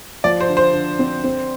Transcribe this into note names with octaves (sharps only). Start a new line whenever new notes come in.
F3 D5
C5
D3
C5
D3
C4
C4